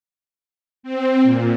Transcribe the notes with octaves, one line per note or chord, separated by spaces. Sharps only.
C4
A#2